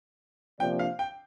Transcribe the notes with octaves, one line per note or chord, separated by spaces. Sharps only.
C3 F3 A#3 D4 G5
F5
G5